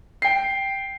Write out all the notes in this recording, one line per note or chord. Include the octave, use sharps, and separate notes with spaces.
G5 C7